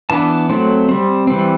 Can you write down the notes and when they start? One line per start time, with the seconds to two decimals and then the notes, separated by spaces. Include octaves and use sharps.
0.10 E3 B3 D4 A5
0.49 F#3 A3 C4
0.89 G3 C4
1.27 E3 G3 C4